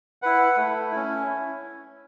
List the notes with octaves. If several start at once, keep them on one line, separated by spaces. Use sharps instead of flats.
E4 B4 F#5
A3
C#4 E4